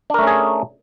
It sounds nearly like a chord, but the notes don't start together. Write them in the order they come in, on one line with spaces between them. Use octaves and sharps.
D4 A#4 A3 C#4 G#4